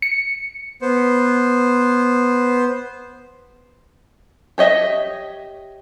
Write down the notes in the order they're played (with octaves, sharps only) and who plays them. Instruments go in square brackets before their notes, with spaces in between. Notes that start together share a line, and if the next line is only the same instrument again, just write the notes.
[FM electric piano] C#7
[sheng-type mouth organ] B3 C5
[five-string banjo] G4 C#5 D#5 E5